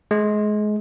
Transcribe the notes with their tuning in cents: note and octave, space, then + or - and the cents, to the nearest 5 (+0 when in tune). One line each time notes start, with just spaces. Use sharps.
G#3 +25